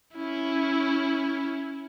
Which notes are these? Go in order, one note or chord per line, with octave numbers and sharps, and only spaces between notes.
C#4 E4